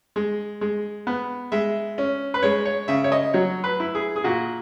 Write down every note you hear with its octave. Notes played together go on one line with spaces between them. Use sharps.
G#3
G#3
B3
G#3 E5
C#4
B4
G#3 C#5
C#5
C#3 E5
C#5
D#5
F#3 C#5
B4
E4
G#4
G#4
A#2 F#4